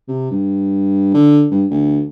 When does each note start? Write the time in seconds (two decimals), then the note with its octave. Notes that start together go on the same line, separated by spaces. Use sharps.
0.08 C3
0.31 G2
1.14 D3
1.51 G2
1.71 D2